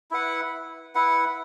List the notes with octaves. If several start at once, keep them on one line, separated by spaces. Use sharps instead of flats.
E4 B4 F#5
E4 B4 F#5